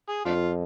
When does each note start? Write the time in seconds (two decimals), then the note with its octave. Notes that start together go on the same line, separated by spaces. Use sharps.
0.08 G#4
0.26 F2 A3 D4 F4